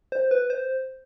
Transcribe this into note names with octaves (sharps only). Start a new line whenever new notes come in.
C5
B4
C5